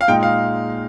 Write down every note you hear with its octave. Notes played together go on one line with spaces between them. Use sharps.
F5
A#2 G#3 D#4 G5
F5